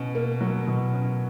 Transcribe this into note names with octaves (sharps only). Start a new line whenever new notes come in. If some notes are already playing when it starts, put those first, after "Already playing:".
Already playing: B2 C#4
A#3
F#3
B2
C#4